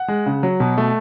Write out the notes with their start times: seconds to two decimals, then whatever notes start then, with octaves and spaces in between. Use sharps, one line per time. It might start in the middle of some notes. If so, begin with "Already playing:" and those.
Already playing: F#5
0.08 G#3
0.26 C#3
0.43 F#3
0.60 B2
0.78 A3